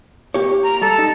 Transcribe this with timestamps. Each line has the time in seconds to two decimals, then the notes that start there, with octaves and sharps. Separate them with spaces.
0.34 A#3 G4 C#5
0.64 A#5
0.82 G3 A4
0.99 D#4